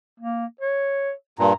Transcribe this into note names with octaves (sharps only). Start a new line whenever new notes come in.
A#3
C#5
G2 A#2 A#5